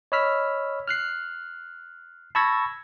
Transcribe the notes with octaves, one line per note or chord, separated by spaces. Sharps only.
C#5 D#5 B5 E6 F6 B6
F6 F#6 C7
A5 B5 C#6 E6 G#6 A#6